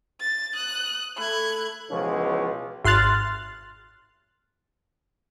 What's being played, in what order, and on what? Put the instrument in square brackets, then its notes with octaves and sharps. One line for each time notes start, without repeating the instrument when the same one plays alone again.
[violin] A6
D#6 F#6
[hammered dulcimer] A3 E4 A4 [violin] F#6 G#6
[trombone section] C#2 B2 E3 F3 C#4 G#4
[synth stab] G#1 C6 F6 F#6 A6